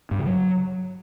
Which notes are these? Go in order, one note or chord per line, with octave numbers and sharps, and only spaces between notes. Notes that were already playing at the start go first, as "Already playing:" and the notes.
G2
C#3
F#3